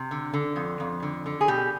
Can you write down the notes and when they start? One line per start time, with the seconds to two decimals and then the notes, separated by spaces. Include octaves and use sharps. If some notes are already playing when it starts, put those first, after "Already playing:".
Already playing: C3
0.11 D3
0.33 D3
0.56 F2
0.80 F2
1.02 D3
1.26 D3
1.41 G#4
1.48 B2 G4